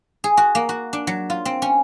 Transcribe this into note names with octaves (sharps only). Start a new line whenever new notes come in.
G#4
F#4
A#3
F#4
D4
F#3
F4
C4
C#4